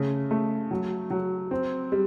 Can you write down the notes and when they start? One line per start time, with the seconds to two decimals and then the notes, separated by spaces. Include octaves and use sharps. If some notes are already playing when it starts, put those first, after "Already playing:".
Already playing: C#3 A3
0.31 A3
0.71 F#3
1.10 F#3
1.51 C4
1.92 G3